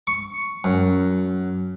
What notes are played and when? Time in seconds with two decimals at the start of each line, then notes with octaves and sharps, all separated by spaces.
0.07 C#6
0.64 F#2